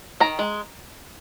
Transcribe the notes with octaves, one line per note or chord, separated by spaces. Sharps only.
D#3 A#5
G#3